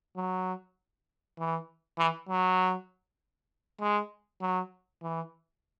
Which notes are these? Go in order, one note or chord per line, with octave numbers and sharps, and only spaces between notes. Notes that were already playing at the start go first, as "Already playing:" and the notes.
F#3
E3
E3
F#3
G#3
F#3
E3